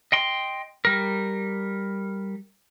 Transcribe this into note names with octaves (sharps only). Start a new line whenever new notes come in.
D#5 G5 C6
G3 A#4